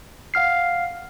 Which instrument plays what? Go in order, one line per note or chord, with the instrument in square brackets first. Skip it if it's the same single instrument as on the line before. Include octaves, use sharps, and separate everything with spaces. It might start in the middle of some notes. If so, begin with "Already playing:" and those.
[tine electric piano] F5 F#5 F6 C7